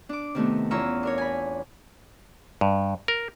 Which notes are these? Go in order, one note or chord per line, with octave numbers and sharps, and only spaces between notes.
D4 D6
C3 D#3 A3 B3
E2 C#4 F4 A#5 C#6 E6
D4 A#4 C#5
G#5 B5
G2
A#4